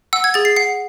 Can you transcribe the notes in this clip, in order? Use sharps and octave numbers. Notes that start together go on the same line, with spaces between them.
F#5 E6
G#6
G#4 A6
C7
F#5 C7